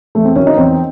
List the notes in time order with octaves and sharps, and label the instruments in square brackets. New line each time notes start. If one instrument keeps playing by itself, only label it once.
[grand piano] E2 A3
C4
D#3 F#3 C#4
D#4
E2 C4